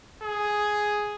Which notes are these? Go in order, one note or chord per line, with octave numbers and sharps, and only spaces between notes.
G#4